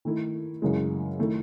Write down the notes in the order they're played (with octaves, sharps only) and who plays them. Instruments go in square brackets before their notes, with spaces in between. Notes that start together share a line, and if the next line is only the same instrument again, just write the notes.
[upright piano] D#3 A3 E4
F#2 C#3 E3 G#3
D#3 A3 E4